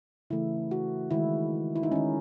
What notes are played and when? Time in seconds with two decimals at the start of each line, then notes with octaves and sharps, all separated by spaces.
0.30 C#3 E3 A3 E4
0.71 F#4
1.11 D#3 G#3 E4
1.76 E4
1.83 D#4
1.92 D#3 G#3 C#4